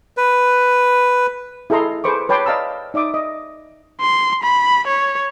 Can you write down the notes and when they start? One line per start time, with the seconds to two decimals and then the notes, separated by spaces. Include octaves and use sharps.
0.17 B4
1.70 E4 G#4 A4 D#5 A#5 C6
2.04 G#4 A4 B4 C5 C#6 D6
2.29 B4 C#5 G5 A5 C6 D6
2.46 D5 D#5 F5 A5 A#5 E6
2.94 D#4 D5 E5 D6 D#6
3.14 D#5
4.01 C6
4.43 B5
4.87 C#5